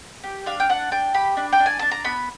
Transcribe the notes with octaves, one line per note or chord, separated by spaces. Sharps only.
G4
D4 F5
G5
D4 F#5
D4 G5
G4 B5
D4
G5
D4
G#5
D4 A5
A#5
B3 B5